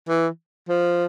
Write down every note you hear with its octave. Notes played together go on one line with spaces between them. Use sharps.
E3
F3